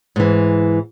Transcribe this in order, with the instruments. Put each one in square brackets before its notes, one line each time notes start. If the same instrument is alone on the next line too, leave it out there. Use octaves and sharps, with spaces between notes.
[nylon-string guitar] G#2 E3